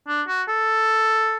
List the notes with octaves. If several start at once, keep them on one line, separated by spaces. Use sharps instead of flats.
D4
F#4
A4